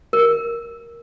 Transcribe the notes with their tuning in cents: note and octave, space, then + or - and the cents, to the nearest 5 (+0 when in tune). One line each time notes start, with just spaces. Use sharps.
A#4 +5